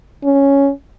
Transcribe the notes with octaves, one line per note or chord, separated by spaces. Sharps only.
C#4